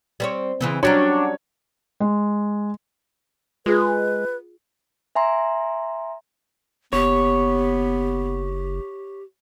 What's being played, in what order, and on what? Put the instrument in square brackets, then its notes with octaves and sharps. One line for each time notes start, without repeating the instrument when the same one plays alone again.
[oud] G3 C4 C#5
C#3 E3 C4
[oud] F#3 G3 C#4 [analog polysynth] D4 F#4 [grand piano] C#5
[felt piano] G#3
[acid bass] G#3 [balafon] F4 G#4 [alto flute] B4
[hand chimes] E5 G#5 A#5 C6
[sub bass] F#1 [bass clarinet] B3 [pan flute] G4 [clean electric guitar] C#5